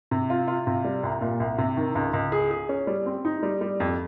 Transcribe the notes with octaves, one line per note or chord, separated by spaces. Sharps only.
C3
F4
F4
C3
G3
C2
A#2
C2
C3
D#3
C#2
C#2
G#4
G#4
C#4
G3
C4
D#4
G3
G3
F2